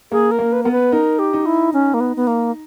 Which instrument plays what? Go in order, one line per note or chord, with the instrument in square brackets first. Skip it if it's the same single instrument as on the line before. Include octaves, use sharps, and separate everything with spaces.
[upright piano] A#3 [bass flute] G#4
[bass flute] A#4
[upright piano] A#3
[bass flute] B4
[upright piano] B3 [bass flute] A#4
[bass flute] B4
[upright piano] D#4 [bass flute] A#4
[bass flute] G4
[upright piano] D#4
[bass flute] E4
C#4
A#3
B3
B3
A#3